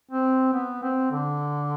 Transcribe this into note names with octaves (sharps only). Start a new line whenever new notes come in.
C4
B3
C4
D3